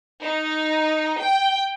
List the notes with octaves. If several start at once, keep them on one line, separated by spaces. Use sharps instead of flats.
D#4
G5